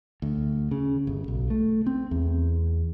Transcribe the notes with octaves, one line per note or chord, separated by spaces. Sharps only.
D2
C#3
G1
B1
A3
C4
E2